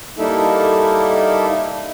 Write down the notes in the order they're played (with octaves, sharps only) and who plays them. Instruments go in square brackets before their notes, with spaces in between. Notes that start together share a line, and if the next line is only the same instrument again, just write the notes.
[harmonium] G3 A#3 D#4 E4 A4 E5